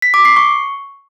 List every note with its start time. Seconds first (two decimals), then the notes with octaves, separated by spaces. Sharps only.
0.02 B6
0.14 D6
0.25 C7
0.36 C#6